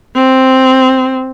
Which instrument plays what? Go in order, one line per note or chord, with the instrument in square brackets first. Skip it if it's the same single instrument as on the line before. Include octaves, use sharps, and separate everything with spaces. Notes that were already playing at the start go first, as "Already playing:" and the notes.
[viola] C4